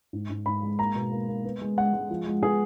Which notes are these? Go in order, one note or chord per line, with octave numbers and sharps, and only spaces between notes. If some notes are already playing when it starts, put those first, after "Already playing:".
G#2
G#2
G#2 B5
G#3
A#3 A#5
B2
A#3
A#3
B3
G#3
G#3 F#5
G#3
F3
G#3
B3 G#4